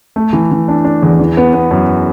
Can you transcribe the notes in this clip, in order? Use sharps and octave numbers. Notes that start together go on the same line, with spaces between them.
A3
E3
E3
D4
D4
E2
E3
B3
B3
F#2